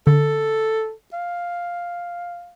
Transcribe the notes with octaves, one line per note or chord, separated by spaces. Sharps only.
D3 A4
F5